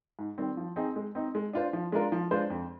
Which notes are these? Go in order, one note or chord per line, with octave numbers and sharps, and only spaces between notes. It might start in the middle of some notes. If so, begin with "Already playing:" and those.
G#2
D#3 G3 C4
F3
C4 D#4 G#4
G#3
C4 D#4
G#3
D4 F4 C5
F3
G#3 D4 F4 A#4
F3
G#3 D4 F4 C5
F2